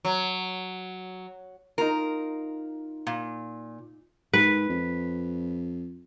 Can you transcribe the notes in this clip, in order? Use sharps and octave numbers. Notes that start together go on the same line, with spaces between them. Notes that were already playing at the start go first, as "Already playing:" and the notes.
F#3
D#4 F4 A#4
A#2
G#2 B4
F2